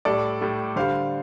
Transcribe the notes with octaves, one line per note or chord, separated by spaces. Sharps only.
A2 G3 A4 D5
A2 G3
D3 G3 C5 F5